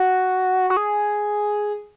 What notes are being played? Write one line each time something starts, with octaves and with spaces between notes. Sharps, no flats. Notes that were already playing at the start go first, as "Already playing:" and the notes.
Already playing: F#4
F#4
G#4